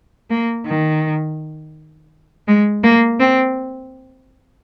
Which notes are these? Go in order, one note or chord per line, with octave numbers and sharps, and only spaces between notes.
A#3
D#3
G#3
A#3
C4